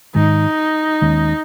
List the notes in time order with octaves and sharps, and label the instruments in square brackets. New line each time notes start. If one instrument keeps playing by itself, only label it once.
[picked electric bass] G#2 D#3 G#3 [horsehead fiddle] D#4
[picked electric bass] D#2 D#3 G#3 C#4